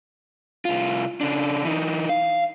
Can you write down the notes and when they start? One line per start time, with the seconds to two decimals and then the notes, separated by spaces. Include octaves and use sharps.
0.65 C2 F4
1.21 C#3 D4
1.65 E3 D#4
2.09 F5